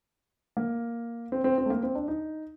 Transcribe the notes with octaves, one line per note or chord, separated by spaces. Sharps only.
A#3
C4
C4
C4
A3
A#3
C4
D4
D#4